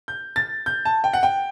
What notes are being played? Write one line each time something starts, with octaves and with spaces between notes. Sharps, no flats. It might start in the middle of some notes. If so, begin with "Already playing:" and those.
G6
A6
G6
A5
G5
F#5
G5